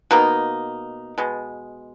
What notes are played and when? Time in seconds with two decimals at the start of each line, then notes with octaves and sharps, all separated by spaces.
0.11 B2 A#3 D#4
1.18 B2 G#3